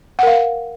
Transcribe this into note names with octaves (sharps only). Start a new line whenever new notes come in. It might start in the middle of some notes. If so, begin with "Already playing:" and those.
A#4 F5 F#5